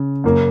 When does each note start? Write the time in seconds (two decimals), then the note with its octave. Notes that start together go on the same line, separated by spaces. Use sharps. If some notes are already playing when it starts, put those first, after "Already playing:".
Already playing: C#3
0.24 F#2 C#3 A#3